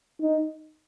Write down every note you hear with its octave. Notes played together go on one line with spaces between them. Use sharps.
D#4